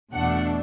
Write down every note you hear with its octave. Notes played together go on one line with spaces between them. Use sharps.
E2 B2 A3 D4 F#5